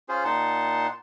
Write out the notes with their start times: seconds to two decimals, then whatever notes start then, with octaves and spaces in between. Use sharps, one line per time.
0.09 C#4 F4 G#4 C5
0.24 A#2 D#4 F#5 A5 C6